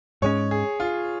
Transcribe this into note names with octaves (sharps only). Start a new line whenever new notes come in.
G#2 G#3 C#4 C#5
G#4
F4